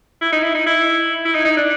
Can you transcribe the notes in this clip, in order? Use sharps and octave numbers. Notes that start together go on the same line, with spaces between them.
E4
D#4
E4
D#4
E4
E4
D#4
D#4
D4